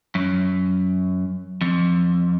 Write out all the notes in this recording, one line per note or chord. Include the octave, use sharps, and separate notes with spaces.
F#2
F2